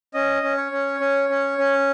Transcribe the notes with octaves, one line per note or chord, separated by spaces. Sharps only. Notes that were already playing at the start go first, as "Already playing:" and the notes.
C#4 D#5
C#4
C#5
C#4
C#4
C#4
C#4